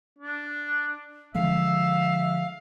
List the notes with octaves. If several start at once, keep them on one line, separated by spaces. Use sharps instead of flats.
D4
D3 F3 G#3 E5 F5